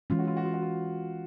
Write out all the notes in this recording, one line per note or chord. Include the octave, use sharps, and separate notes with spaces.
E3 G#3 C#4 F4
F#4
F4
F#4
F4
F#4
F4